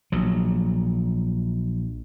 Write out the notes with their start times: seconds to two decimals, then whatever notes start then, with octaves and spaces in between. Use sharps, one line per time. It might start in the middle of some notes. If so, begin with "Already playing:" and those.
0.12 A#1 F#3